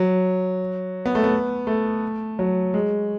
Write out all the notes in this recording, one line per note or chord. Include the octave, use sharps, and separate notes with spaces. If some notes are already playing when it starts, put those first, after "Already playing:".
Already playing: F#3
B3
A3
B3
A3
F#3
G#3